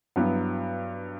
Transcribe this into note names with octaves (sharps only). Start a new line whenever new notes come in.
G2 F#3 B3 E4